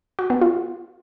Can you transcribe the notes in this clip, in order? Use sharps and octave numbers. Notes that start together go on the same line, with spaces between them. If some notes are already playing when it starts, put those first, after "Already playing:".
F#4
B3
F4